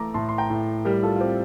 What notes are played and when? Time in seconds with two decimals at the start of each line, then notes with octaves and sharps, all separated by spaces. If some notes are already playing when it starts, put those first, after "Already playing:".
Already playing: E3 A3 A#5 D6
0.14 A2 A5 C6
0.29 C6
0.38 G5 A#5
0.50 A2
0.85 G3 G4 A#4
1.03 F4 A4
1.16 F4
1.20 C4 G4